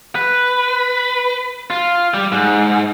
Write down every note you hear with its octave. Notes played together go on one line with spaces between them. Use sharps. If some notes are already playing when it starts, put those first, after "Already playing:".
B4
F4
G3
G#2